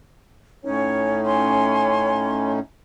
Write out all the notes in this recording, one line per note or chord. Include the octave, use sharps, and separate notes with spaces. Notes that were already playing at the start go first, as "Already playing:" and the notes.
A2 C#4 D#4 C#5
C#5 G#5 C6